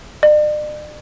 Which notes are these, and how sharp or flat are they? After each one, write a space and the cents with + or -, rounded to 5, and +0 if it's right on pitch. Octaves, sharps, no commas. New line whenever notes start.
D5 +40